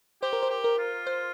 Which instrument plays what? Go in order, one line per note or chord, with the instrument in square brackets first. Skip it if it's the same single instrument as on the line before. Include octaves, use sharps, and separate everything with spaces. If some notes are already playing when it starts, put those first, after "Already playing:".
[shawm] G4 [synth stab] C5
[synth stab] A#4
C5
[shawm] G4
[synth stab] A#4
[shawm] F4
[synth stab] C5